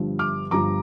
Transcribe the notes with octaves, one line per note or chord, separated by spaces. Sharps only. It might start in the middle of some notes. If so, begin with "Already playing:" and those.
Already playing: G1 G2 F3
D6 F6
G1 G2 F3 A#5 D6